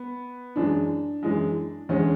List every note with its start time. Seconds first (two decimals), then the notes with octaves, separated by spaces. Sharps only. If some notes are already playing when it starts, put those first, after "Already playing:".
Already playing: B3
0.56 F#2 E3 G#3 D4
1.23 F#2 E3 G#3
1.89 E2 D3 G#3 C#4